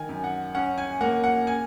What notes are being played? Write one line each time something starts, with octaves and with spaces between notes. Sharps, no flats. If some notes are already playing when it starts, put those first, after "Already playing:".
Already playing: D#3 G#5
F#2
F#5
C#4 F#5
G#5
A#3 F#5
F#5
G#5